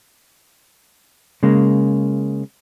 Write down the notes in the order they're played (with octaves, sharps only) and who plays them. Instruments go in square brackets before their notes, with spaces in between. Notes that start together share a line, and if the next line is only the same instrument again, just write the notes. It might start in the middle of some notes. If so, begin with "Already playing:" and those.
[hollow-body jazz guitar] C#3 G#3 A#3